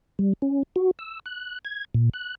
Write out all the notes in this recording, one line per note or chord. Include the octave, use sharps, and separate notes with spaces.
G3
C#4
F#4
E6
F#6
G#6
A#2
F#6